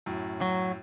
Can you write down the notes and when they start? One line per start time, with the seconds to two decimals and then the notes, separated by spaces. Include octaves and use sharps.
0.06 F#2 A2
0.41 F#3